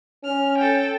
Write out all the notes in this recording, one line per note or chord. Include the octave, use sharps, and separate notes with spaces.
C#4 F6
A4 G5